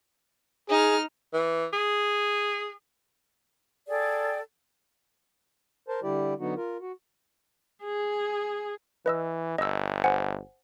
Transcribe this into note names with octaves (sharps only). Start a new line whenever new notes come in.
D#4 G#4 F6
E3
G#4
G#4 A4 D5 G5
A#4 C5 A5
D3 G3 E4 G4 D5
D3 F#3 B3 D#4 F#4
F4 A#4
F#4
G#4
E3 B4 D#5 E6
G1 D#5 E6
C5 F#5 G#5